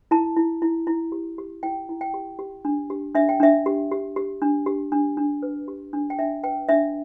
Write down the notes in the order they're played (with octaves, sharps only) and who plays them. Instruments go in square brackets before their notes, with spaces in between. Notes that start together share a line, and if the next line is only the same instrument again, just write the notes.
[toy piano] E4 A5
E4
E4
E4
G4
G4
E4 G5
E4
G5
G4
G4
D4
G4
D4 E5
G5
D4 E5
G4
G4
G4
D4
G4
D4
D4
B4
G4
D4
G5
D4 E5
B4 G5
D4 E5